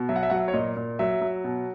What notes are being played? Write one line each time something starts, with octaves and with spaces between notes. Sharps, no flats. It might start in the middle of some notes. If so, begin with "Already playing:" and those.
Already playing: B2
F#3 E5
F#5
E5
F#3 F#5
E5
C#5
A#2 D#5
A#2
F#3 E5
F#3
B2